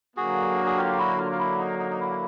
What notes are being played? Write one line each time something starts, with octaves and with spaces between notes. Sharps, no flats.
D3 F#3 A#3 F#4 G#4
G#4
F4 G4
E4 F#4
F4
F4
E4
D#4
D#4
D#4
E4